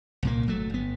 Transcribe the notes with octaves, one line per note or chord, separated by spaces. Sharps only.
C2 A#2 A#3
G1 F#3 A3
G1 B3